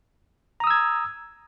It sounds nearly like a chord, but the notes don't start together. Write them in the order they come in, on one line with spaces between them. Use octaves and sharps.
A#5 D#6 E6 G#6